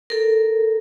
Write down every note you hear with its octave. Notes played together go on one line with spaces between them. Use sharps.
A4 A#4